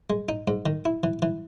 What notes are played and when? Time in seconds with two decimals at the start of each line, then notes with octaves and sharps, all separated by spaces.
0.10 G#3
0.29 D#4
0.48 G#2
0.66 D#3
0.85 E4
1.03 E3
1.22 E3